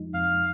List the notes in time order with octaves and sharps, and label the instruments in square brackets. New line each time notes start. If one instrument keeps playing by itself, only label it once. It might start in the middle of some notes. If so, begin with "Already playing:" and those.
Already playing: [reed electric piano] F2 F3 G#3 D#4
[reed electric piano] F2 [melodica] F5